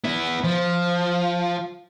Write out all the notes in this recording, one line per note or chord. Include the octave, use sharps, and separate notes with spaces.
B3 E4
F3